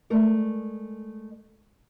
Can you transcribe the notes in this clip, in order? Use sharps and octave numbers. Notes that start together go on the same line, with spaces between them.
G#3 A3 A#4 D5